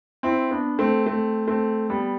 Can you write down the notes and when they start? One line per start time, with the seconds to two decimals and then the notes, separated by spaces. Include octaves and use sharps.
0.23 C4 E4
0.51 B3 D4
0.79 A3 C4
1.06 A3 C4
1.47 A3 C4
1.90 G3 B3